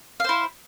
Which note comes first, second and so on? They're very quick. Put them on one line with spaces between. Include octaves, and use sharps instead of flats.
F5 C5 E4